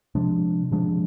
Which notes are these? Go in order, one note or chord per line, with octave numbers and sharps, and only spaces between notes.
C3 F3 G#3 D4
C3 F3 G#3 D4